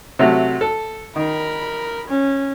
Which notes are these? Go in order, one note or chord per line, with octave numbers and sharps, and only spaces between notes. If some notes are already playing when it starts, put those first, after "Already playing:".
C3 F#3 A3
A4
D#3 A#4 B5
C#4